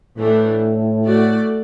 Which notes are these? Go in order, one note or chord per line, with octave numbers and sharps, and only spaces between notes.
A2 E3 A3 D4
A3 F#4 D5